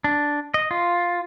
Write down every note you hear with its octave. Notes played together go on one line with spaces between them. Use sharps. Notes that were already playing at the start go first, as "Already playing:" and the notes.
D4
D#5
F4